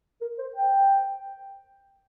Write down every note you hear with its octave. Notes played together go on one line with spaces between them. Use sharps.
A#4
C5
G5